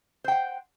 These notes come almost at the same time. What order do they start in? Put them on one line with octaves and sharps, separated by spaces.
C5 G5 F#5